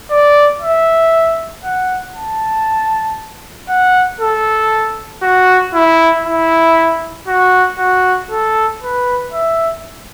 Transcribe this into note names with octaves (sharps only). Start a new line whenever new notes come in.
D5
E5
F#5
A5
F#5
A4
F#4
E4
E4
F#4
F#4
A4
B4
E5